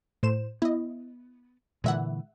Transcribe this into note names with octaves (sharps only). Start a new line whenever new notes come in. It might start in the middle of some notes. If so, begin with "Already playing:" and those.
A2 C5 E7
B3 E4 D#5
A#2 D3 E3 G#3 E5 F#5